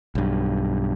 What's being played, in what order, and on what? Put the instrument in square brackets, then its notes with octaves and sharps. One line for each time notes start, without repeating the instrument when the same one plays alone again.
[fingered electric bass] B1 G2